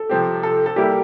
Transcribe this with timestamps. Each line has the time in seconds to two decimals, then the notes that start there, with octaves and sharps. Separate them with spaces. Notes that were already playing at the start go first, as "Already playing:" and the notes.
Already playing: A4
0.09 C3 F3 C4 G4
0.43 A4
0.66 A4
0.76 G3 A#3 E4 G4